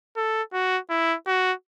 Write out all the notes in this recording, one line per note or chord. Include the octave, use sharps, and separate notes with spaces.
A4
F#4
E4
F#4